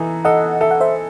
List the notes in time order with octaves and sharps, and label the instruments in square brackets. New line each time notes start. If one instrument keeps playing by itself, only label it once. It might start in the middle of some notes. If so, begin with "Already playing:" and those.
Already playing: [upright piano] E3 D#4 A4
[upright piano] A4 [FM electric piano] D#5 F#5
[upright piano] A4 [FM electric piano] E5
[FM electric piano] F#5
C5 E5